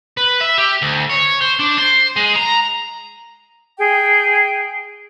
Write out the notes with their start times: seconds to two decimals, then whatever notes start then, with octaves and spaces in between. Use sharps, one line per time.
0.17 B4
0.41 E5
0.58 G4
0.82 D2
1.09 C#5
1.41 C5
1.59 D4
1.78 C5
2.16 G#3
2.35 A#5
3.79 G#4 G5